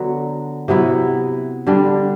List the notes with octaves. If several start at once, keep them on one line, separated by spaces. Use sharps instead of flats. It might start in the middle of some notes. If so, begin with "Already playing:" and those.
Already playing: D3 F#3 B3
C3 F#3 B3 E4
D3 G3 D4